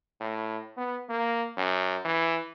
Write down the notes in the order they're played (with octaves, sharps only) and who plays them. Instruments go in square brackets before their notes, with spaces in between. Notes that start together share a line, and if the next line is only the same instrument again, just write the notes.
[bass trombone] A2
B3
A#3
F#2
E3